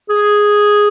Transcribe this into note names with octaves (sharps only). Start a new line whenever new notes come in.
G#4